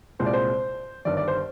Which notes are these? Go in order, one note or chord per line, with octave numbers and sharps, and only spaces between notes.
C2 A#2 G#3 C4 C5
D5
C5
G1 G2 D#3 D5
D5
C5